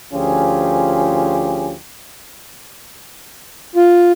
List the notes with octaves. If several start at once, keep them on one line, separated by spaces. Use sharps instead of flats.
D2 F3 C#4 F4 G4 G#4
F4